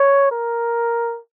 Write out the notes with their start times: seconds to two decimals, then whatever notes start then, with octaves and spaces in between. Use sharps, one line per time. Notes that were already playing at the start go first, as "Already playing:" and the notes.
Already playing: C#5
0.31 A#4